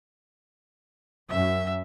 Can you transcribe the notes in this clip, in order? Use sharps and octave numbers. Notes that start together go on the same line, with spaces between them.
F#2 E5